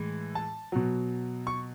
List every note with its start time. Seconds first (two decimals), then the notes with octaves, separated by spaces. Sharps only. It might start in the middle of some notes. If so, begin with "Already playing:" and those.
Already playing: A2 E3 G#3
0.35 A5
0.72 B2 F#3
1.47 C#6